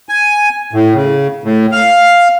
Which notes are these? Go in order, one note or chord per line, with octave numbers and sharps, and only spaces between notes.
G#5
A2
C#3
A2
F5